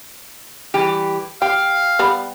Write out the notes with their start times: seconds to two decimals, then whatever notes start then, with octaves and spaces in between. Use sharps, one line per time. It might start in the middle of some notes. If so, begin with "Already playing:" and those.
0.74 E3 G3 G4
1.42 G4 F5 G5
1.99 G3 B3